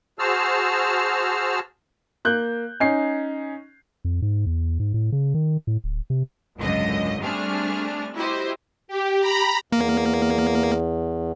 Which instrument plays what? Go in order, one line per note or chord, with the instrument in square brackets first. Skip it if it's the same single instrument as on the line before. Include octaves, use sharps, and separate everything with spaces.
[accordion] F#4 G#4 C5 A5 E6 F6
[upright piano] A#3 F#6 G6
C#4 D#4 C7
[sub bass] F2
G#2
E2
G#2
A2
C#3
D#3
A2
D1
C3
[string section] G#1 C#2 F#2 D3 D#5
G3 A3 C4 D4 G#4 F6
E4 F#4 G4 C5 D#5
[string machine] G4
A#5 B5
[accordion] E2 [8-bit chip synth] A#3